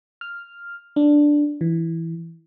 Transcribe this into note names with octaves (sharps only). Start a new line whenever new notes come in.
F6
D4
E3